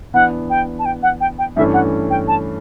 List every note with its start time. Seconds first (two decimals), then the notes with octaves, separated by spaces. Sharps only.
0.14 E3 B3 D4 F#5
0.50 G5
0.79 A5
0.85 G5
1.03 F#5
1.21 G5
1.39 G5
1.56 G2 E3 A3 C#4 E5
1.74 F#5
2.10 G5
2.28 A5